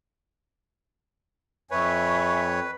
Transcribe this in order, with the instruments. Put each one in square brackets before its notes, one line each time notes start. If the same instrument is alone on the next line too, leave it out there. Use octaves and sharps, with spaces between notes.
[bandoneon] F2 C#5 [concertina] B4 [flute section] E5 G#5 C#6